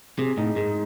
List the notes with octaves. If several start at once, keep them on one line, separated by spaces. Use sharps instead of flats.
C3 G#4
A2 D#4
G#2 G#3